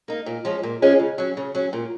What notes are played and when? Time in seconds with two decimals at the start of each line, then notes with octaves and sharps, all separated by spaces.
0.08 A#3 D#4
0.26 A#2
0.45 F3 G#3 C#4
0.63 A#2
0.82 F3 G#3 C#4
0.99 C#3
1.18 F#3 C#4
1.37 C#3
1.55 F#3 C#4
1.73 A#2